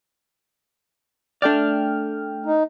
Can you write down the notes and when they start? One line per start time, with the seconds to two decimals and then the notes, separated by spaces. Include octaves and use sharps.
1.42 A3 D4 D5 G5 F6
2.46 D#4